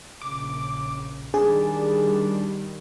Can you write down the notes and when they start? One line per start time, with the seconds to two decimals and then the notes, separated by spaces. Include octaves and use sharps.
0.22 A#1 C#3 D6
1.34 D#3 G3 D4 G#4